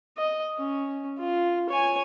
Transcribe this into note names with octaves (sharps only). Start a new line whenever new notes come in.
D#5
C#4
F4
C#5 G#5